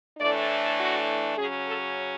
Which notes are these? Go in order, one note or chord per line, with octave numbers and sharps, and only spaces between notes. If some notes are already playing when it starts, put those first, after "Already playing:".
A2 E3 A3 D4 D5
F#4
C#3 F#3 C#4 G#4
A4